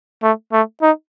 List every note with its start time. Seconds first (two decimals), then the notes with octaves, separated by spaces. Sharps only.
0.23 A3
0.52 A3
0.82 D#4